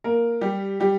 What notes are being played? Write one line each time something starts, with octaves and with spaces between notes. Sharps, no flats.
A#3 A#4
G3 G4
G3 G4